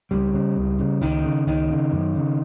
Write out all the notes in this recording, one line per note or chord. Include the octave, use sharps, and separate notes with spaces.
C#2 G3
C#3
C#2
C#3
C#2 D#3
C#3
C#2 D#3
C#3
F#2
C#3